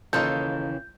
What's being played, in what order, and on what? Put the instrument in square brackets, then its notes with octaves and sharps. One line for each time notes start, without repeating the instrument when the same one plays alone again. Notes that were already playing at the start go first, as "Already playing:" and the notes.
[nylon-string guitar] D#2 C#3 E3 [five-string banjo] D#4 F4 A4 [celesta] G6